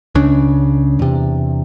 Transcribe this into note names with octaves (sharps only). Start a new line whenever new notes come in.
C#2 C#3 D4
E2 C3